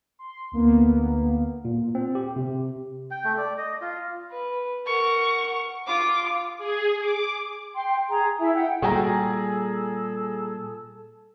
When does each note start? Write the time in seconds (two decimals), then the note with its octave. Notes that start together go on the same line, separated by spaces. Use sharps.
0.19 C6
0.52 D2 A#3 B3
1.65 A#2
1.95 C4
2.15 G4
2.36 C3
3.11 G5
3.24 A3
3.38 D5
3.58 D#5
3.81 F4
4.31 B4
4.87 A#4 F#5 C#6
5.87 F4 D6
6.58 G#4
7.00 D6
7.75 G5 C6
8.09 G#4 A#5
8.39 E4 E5
8.54 F#5 G5
8.82 A#2 G3 F#4 G#4 A4 G5 G#5 A#5